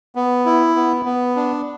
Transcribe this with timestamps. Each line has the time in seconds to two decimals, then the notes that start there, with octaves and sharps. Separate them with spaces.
0.15 B3
0.46 E4
0.76 B3
1.05 B3
1.36 D4